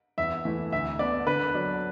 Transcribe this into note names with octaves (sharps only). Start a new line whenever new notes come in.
E2 E5
E3 A3 E4
D2 E5
D3 B3 D4 D5
D3 B4
F#3 D4